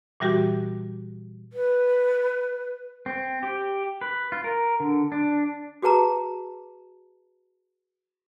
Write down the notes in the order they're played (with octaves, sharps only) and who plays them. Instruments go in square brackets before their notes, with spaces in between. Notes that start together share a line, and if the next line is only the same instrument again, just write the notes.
[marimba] A#2 E3 G3 F#4 G4
[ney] B4
[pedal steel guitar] C4
G4
B4
F4
A#4
D3
D4
[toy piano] F#4 G#4 B4 A5 A#5